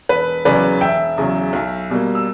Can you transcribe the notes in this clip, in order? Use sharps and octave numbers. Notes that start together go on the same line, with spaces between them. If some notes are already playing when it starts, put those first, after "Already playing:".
E1 B4
E2 C#3 F#3 B4 D5
E1 E5 G5
E2 C#3 F#3
B1
B2 G3 A#3
E6